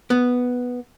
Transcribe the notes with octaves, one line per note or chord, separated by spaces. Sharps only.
B3